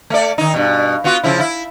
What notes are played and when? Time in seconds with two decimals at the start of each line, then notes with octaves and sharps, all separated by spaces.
0.10 A3 D5
0.38 D#3 D#4
0.54 G2 B2
1.04 B3 F4 F#4
1.23 C#3 F3 E4
1.40 E4